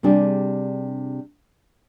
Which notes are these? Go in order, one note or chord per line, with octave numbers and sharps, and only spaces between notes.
C3 G3 D4 G#4